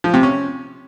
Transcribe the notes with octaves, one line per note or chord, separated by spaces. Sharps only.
F3
C3
C#4